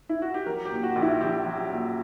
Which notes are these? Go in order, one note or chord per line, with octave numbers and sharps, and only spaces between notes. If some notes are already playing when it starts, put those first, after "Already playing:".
E4
F#4
G4
F#3 A#4
G4
A#2
F#4
A#1
E4
A#1 G4
F#3
A#2